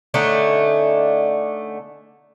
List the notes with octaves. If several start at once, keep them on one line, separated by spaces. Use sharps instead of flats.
D3 A3 C#4 D#4